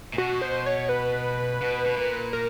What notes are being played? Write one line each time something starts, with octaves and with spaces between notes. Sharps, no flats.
A#2
B2 F#4
C5
C#5
B4
B2
B2
A#2
A#4